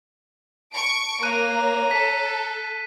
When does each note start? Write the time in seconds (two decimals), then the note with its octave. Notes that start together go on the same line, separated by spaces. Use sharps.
0.73 A5 C#6 D7
1.23 A#3 C#5 A#5 F#6 D#7
1.91 A4 B6